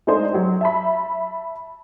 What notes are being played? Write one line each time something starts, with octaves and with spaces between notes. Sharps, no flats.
G#3 A3 D4 D#4 C5 D#5
F#3 G4
E5 A5 B5